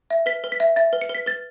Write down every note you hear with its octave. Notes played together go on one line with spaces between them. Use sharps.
E5
B4 B6
B4
B6
E5
E5 A6
B4
C#7
B4
B6
B4 A6